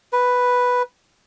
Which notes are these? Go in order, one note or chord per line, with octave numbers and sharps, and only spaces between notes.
B4